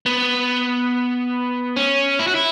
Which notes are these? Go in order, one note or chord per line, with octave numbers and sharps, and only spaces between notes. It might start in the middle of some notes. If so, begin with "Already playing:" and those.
B3
C#4
E4
F#4
E4